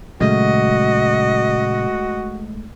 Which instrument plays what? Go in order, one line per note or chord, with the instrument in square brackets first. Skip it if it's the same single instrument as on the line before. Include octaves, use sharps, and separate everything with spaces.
[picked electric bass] A#2 C#3 F#3 [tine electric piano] G#3 A3 [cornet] F#4 [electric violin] D#5